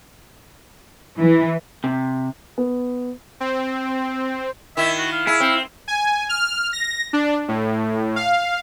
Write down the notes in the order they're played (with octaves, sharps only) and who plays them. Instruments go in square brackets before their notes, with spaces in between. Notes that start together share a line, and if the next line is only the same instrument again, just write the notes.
[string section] E3
[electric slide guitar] C3
[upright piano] B3
[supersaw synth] C4
[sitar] D#3 E4 [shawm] E5
[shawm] F#4
F5
[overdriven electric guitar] E4 [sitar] G#4
[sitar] C4
[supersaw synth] G#5
F6
A#6
D4
A2
F5